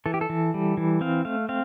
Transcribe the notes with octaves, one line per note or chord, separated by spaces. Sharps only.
E3 A4
G4
A4
E3
G3
E3
C4 F5
A3 F5
C4 F5